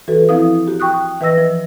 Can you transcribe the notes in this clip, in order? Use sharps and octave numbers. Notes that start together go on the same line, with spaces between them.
E3 F#4 A4 B4
F3 C4 E4 F5 D#6
F#4 G4
G5 C#6 D#6 F#6
E3 B4 D#5 E6 A#6
F3